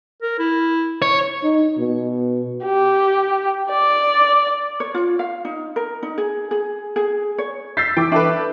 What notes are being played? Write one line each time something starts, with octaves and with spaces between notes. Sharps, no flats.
A#4
E4
C#5
D#4
B2
G4
D5
C#5
F4
F5
D#4
A#4
D#4
G#4
G#4
G#4
C#5
E6 G6 A6 B6 C7
E3 G5 D6
D4 A4 B4 E5 D6